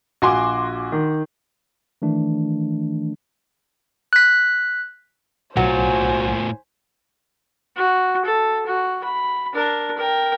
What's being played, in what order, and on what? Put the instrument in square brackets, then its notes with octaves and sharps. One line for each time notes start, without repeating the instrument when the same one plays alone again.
[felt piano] A#1 G#5 [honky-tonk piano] F#4 C6 D6
[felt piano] D#3
[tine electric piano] D#3 E3 A3 D4
[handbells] F#6 B6
[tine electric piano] B1 F#5 [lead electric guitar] A2 F4 [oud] F#3 [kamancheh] C5 G#5
[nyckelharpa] F#4
A4
F#4
B5
D4 A#4
A#4 G5